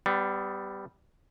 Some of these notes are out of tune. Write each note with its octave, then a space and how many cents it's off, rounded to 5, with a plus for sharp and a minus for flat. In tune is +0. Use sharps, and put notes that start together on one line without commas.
G3 +0 B3 +30